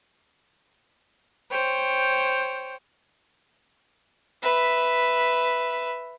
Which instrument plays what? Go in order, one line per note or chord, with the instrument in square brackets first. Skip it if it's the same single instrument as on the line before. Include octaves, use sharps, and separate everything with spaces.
[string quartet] C5 C#5 G5
[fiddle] B4 E5